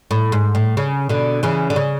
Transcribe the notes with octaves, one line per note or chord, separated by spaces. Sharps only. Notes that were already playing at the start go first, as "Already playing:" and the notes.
A2
G#2
A2
C#3
B2 D3
C#3 E3
D3
C#3